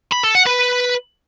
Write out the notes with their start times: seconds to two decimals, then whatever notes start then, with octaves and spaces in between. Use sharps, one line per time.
0.12 B5
0.23 A4
0.35 F#5
0.47 B4